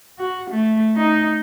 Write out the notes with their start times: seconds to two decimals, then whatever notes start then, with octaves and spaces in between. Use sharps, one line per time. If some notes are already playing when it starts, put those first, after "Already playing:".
0.19 F#4
0.50 A3
0.97 D#4